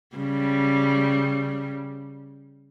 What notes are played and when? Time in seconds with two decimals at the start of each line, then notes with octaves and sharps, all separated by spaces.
0.16 C#3 G3